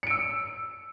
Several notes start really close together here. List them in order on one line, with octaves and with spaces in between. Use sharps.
C#7 D7 E6